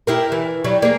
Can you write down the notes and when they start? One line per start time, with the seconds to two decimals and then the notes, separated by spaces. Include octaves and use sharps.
0.07 E4 G4 A#4
0.32 E3
0.64 F#3 G3
0.82 A#3 G#4